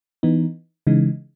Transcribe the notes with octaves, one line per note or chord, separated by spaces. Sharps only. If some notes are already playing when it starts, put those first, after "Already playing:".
E3 B3 D#4
C#3 E3 G#3 D#4